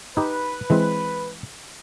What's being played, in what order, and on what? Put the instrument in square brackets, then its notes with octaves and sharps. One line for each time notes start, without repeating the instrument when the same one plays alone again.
[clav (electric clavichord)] D#4 G4 [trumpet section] B4
[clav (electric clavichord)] E3 G#3 C4